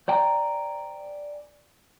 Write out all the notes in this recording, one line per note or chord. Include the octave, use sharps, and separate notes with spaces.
C5 D5 G5 G#5 A#5